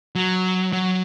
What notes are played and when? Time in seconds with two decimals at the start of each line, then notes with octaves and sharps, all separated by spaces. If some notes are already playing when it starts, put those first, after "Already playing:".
0.15 F#3
0.73 F#3